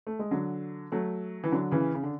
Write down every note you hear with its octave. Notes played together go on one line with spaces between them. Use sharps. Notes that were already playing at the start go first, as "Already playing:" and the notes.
A3
G#3
D3 F#3
F#3 A3
E3
D3 F#3
C#3 E3
C#3
D3